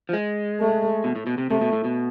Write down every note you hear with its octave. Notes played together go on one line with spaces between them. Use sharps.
F3
G#3
A3
B2
A2
B2
C3
C3 A3
B2
A2
B2